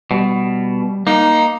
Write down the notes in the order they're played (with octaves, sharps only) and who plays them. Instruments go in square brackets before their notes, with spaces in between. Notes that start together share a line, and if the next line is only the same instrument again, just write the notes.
[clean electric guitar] B2 [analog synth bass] G3
[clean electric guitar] A#3 [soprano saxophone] D#4